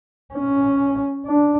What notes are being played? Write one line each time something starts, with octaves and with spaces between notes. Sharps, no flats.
C#4
D4